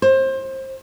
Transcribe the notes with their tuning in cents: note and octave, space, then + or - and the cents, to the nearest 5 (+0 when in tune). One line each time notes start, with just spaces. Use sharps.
C5 +25